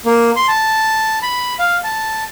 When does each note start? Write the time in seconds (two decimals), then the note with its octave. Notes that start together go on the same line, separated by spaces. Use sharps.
0.06 A#3
0.36 C6
0.48 A5
1.22 B5
1.59 F5
1.84 A5